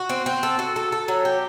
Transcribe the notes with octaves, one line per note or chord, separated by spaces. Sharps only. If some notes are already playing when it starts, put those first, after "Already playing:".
Already playing: F#4
C4
C4
A4
F#4
A4
A4
F#3
G4